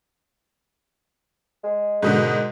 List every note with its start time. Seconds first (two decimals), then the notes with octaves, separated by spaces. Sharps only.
1.63 G#3
2.03 G#2 B2 D3 D#3